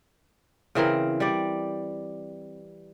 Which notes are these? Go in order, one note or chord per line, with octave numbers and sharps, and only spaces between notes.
C#3 E3 C4 A#4
G3 D5